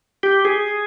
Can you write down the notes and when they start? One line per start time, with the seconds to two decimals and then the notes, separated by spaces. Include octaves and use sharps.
0.23 G4
0.45 G#4